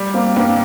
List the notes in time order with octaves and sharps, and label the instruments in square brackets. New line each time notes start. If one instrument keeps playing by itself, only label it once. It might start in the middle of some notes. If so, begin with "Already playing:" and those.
Already playing: [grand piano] G3
[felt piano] A#3 C4
[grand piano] G2 [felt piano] A#3 C4